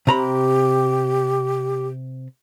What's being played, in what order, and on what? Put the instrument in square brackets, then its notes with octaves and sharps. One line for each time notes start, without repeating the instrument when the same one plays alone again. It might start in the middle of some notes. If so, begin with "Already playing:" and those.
[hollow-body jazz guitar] C3 A#5 B5 [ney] G4